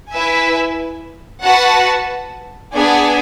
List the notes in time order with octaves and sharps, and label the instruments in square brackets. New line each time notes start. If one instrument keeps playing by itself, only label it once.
[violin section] E4 B4 E5 G#5
F#4 B4 F#5 A5
B3 D4 G#4 D5 G#5